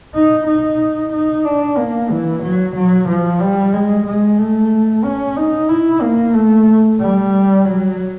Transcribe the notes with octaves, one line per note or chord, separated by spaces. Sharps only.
D#4
D#4
D#4
D4
A#3
E3
F#3
F#3
F3
G3
G#3
G#3
A3
C#4
D#4
E4
A#3
A3
G3
F#3